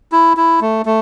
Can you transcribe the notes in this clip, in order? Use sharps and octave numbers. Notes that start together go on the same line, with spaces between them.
E4
E4
A3
A3